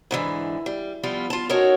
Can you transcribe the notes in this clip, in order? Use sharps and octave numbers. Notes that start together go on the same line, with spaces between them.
G#2 D3 E3
G3
F3 G3 B3 E4 F4
F4 A5
C#4 D#4 F#4 A4 A#4 C#5